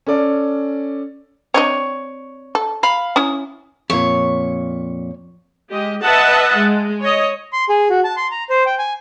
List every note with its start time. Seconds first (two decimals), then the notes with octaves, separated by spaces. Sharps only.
0.07 C#4 A4 D5
1.54 C4 D4 C#5 D#5 C#6
2.55 A4
2.83 F5 B5
3.16 C#4 E4 D#6
3.90 F2 A#2 C#5
5.71 G#3 G4 D#5
6.03 B4 D#5 E5 F#5 A5
6.56 G#3
7.01 C#5 D#5
7.53 C6
7.69 G#4
7.90 F#4
8.04 A5
8.17 C6
8.31 A#5
8.50 C5
8.66 G5
8.79 G#5